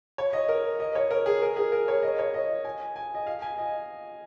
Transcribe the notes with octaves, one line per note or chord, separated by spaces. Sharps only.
C#5
D#5
A#4
D#5
C#5
A#4
G#4
A#4
G#4
A#4
C#5
D#5
C#5
D#5
G#5
G#5
D#5
F5
G#5
D#5